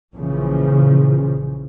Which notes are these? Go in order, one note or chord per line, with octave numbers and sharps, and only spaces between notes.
A#1 A#2 C#3 E3 F3